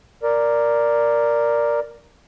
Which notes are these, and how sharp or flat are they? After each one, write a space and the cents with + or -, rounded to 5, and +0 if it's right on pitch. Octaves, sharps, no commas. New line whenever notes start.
A#4 +0 D5 +0